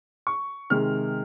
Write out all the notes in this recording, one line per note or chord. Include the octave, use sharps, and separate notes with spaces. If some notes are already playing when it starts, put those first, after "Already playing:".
C#6
C3 D#3 G#3 F6